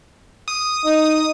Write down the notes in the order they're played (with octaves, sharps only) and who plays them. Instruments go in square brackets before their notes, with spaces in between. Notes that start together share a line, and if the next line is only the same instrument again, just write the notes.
[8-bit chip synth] D#6
[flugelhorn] D#4